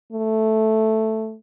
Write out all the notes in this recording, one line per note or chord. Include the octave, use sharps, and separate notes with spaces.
A3